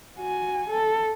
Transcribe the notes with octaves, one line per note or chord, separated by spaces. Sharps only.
F#4 G#5
A4